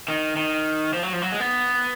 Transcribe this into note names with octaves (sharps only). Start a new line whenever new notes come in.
D#3
D#3
F3
F#3
F3
F#3
G#3
B3